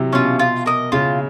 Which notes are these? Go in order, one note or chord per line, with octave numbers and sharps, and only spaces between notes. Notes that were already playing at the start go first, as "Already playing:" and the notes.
Already playing: C3 E3 F#3
B2 C#4 F4
F4
A#4 D#5
C#3 F4